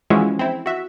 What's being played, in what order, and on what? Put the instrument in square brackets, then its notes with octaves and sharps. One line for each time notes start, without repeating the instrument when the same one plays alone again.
[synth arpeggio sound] E3 F3 G#3 C#4 E4 F#4
C4 E4
F#4 E5